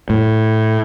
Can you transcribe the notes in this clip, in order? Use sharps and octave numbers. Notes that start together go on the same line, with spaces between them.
A2